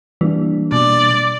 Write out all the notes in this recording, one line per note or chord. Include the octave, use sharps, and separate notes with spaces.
E3 G3 A#3 D4
B2 D5